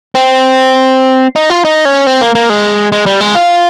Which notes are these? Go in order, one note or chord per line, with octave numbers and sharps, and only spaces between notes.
C4
D#4
F4
D#4
C#4
C4
A#3
A#3
G#3
G#3
G3
G#3
F4